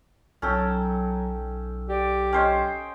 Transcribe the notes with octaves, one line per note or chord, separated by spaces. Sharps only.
B1 F#3 C#4 A4 G5
G4 D5
C#4 C5 D#5 G5